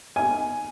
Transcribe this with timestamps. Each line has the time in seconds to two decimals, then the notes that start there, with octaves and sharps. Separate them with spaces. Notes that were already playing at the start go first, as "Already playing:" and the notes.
0.16 G#5